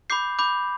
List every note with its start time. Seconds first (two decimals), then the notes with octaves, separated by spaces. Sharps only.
0.10 B5 D6 G6 C7
0.39 B5 D6 G6